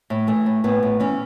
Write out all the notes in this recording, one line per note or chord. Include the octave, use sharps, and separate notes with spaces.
A2
E3 A3
A2
A2 B3
A2
E3 C#4